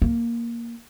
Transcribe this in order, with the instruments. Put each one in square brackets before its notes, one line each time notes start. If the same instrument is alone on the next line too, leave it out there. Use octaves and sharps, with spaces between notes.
[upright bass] A#3